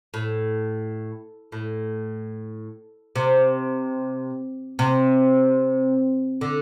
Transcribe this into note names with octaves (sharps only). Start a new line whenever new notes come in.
A2
A2
C3
C3
D3